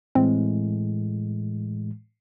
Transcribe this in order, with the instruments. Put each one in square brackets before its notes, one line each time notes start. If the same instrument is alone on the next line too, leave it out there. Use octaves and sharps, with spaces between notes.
[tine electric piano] A2 E3 G#3 [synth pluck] C4